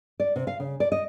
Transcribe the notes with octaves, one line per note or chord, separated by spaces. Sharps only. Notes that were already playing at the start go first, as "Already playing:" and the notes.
D5
C3
F5
C#3
D5
D#5